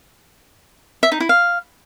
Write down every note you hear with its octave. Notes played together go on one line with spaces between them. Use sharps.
E5
D#4
E4
F5